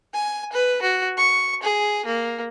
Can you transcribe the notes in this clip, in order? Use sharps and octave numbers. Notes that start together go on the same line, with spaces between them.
G#5
B4
F#4
C#6
G#4
A#3